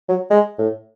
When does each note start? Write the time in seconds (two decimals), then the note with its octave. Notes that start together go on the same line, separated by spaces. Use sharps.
0.09 F#3
0.30 G#3
0.59 A2